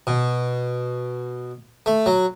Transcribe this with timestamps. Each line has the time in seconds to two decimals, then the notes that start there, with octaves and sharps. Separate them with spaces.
0.07 B2
1.86 A3
2.06 F#3